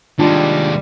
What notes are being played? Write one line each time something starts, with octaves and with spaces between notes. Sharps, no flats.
D#2 G3 G#3 D4 F4 A5